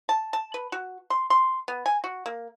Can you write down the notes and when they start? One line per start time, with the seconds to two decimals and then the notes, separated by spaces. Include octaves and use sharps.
0.09 A5
0.33 A5
0.54 B4
0.72 F#4
1.10 C6
1.30 C6
1.68 B3
1.86 G#5
2.04 F#4
2.26 A#3